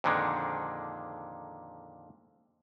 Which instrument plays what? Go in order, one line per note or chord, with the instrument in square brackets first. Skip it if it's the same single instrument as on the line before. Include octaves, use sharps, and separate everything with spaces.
[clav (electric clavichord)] F2 A#2 D3 D#3 G#3